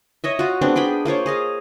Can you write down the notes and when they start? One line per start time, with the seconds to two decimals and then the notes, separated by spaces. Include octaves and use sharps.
0.24 C#5 D#5 E5
0.39 F4 F#4
0.62 G#3 B3 C4 D4
0.76 D4 G#4 G5 B5
1.05 A#3 F4 C5 C#5
1.26 G#4 D#5 F5